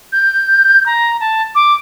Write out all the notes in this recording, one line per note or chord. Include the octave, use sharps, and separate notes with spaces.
G6
A#5
A5
D6